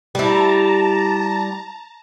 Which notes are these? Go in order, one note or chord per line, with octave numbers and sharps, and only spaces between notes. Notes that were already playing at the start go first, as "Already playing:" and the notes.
G3 E4 A5 A#5